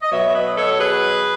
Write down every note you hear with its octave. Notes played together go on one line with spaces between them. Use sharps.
D#5
B2 F#3 B3 C#5 E5
C#5
B4 D#5
A4 C#5
G#4 B4